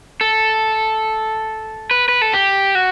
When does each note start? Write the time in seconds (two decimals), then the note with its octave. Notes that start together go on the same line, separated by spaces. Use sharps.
0.21 A4
1.91 B4
2.08 B4
2.22 A4
2.33 G4
2.75 F#4